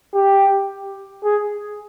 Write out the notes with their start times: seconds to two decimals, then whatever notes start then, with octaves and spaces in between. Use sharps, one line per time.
0.14 G4
1.24 G#4